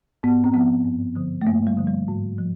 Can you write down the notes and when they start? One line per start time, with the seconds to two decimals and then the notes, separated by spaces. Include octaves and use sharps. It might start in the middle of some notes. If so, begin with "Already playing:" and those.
0.23 G#2 B3
0.44 C4
0.54 F3 B3
0.85 G2
1.16 D3 F3
1.41 A3
1.47 G2 A#3
1.67 G3
1.77 D3 F3
1.87 G3
2.08 G#2
2.38 F3